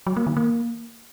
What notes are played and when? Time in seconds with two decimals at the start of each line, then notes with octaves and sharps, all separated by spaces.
0.07 F#3
0.17 A#3
0.27 D#3
0.37 A#3